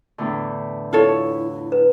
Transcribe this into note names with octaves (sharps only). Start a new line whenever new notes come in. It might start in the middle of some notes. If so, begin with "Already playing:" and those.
E2 A2 D3
E4 F4 A4 C#5
B4